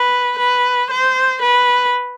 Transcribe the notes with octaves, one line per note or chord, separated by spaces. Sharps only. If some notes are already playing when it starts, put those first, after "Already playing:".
Already playing: B4
B4
C5
B4